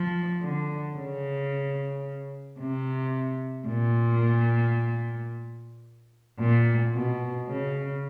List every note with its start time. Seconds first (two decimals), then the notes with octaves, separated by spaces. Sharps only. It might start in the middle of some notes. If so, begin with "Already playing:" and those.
Already playing: F3
0.42 D3
0.96 C#3
2.59 C3
3.68 A#2
6.39 A#2
6.94 B2
7.48 C#3